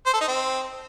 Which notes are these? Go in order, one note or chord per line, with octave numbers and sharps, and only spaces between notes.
C5
A4
D#4
C4